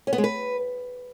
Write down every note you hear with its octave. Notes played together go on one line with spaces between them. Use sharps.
C#4
B3
G#3
B4